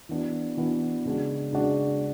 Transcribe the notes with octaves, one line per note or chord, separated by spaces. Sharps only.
E3 B3 D4 F#4
E3 B3 D4 F#4
C#3 G#3 D4 F#4
C#3 G#3 D4 F#4